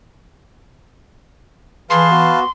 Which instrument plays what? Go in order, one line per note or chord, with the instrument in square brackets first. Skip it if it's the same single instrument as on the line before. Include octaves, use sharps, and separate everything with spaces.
[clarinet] E3 [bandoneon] G#4 [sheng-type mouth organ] B4 F5 A5 [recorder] C6
[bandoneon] B3 F#4